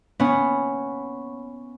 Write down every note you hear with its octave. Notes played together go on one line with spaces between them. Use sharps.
B3 C#4